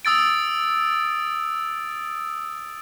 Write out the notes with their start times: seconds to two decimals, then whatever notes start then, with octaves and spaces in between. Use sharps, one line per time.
0.05 D#6 E6 A6 D7